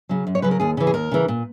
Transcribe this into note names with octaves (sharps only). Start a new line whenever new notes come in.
C#3 F#3
F#2
C#5
C#3 F#3 B4
A#4
D#2 G#4
C#3 E3
G#4
D#2 A#4
C#3 E3
A#2